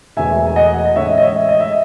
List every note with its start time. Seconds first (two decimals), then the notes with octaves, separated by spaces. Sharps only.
0.17 E1 E2 B2 A3 E5 G#5
0.46 G#5
0.56 D#5 F#5
0.85 D#5
0.96 A1 A2 G#3 C#5 E5
1.18 D#5
1.22 C#5 E5
1.49 D#5
1.60 E5